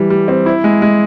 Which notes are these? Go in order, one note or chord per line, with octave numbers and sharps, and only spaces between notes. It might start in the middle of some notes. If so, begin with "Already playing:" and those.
Already playing: E3 G3
G3
C4
E4
G#3
G#3